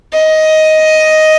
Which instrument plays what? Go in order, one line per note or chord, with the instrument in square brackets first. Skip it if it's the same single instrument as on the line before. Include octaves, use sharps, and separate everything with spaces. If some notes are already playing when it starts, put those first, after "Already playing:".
[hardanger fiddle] D#5